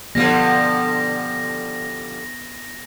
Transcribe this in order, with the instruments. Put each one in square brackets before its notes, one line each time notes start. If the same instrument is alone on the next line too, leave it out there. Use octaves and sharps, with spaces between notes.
[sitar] D3 F3 G3 [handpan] B3 [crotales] A#6